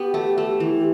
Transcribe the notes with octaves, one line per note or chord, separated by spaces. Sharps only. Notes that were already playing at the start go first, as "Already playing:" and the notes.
Already playing: B3 F#4 G4
A3
A3
E3
G4